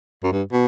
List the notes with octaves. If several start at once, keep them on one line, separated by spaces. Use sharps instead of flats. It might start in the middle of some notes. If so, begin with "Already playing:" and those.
F#2
G2
B2